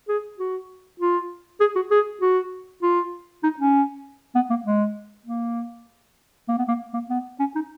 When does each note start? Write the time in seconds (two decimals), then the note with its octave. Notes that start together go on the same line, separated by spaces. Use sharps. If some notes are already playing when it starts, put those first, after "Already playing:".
0.09 G#4
0.39 F#4
1.00 F4
1.60 G#4
1.76 F#4
1.91 G#4
2.21 F#4
2.82 F4
3.43 D#4
3.59 C#4
4.35 B3
4.50 A#3
4.66 G#3
5.26 A#3
6.48 A#3
6.58 B3
6.68 A#3
6.94 A#3
7.10 B3
7.39 C#4
7.55 D#4